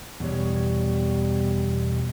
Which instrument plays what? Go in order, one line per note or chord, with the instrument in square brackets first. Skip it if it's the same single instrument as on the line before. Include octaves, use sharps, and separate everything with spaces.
[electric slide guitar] E2 B2 C#5 [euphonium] G3